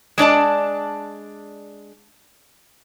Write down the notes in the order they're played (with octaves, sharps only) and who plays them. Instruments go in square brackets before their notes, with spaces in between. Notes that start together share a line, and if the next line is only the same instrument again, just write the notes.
[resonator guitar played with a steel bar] G#3 D4 D5 A5